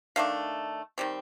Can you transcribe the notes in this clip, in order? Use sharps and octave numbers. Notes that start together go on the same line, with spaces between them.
D#3 A3 D4 F5
D#3 G3 C4